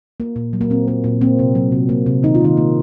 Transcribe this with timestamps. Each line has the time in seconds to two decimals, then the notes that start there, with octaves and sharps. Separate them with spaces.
0.20 A#3
0.36 A#2
0.53 F#3
0.61 A#3
0.70 A#2 C4
0.88 A#3
1.04 A#2
1.21 A#3 C4
1.39 C3
1.55 F#3
1.72 C3
1.89 A#3
2.06 C3
2.23 D#3 D#4
2.35 F4
2.41 D#3 A#3 D#4
2.57 A#3